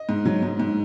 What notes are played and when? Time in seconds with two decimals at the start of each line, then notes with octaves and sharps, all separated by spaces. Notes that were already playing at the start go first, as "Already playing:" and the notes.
Already playing: D#5
0.09 G#2
0.25 F#3
0.43 G#2
0.60 G#2